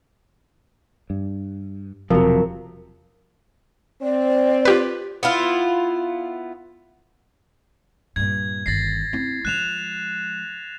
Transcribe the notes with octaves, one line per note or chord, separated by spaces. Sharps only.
G2
E1 C3 F3 F#3 A#4
C4 D5
F4 G4 B4
B3 E4 F4
G2 A#2 G#6
G1 D#3 A6 A#6 C7
C4 E4
F3 G#3 F#6 E7 F7